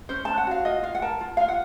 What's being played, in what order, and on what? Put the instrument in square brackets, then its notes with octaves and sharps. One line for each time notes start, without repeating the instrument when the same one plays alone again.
[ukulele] C#4 C5
C#4 A5
F#5
F#4 F5
F4 D#5
F4 F5
F#5
A#4 A5
F4
F4 F5
F#5